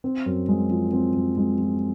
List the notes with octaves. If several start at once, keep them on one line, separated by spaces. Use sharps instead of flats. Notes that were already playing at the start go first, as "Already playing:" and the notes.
C4
F#2
G#3
F3
C4
F#2
G#3
F3